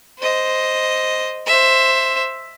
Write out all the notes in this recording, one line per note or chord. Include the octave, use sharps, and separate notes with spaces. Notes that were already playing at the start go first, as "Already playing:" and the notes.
C5 D#5
C5 E5